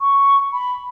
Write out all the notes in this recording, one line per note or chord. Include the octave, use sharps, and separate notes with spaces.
C#6
B5